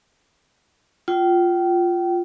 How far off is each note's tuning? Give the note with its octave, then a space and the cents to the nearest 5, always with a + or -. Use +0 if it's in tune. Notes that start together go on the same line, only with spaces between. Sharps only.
F4 +0 G5 -30